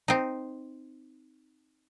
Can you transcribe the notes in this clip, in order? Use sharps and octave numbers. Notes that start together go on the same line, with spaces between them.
C4 D#4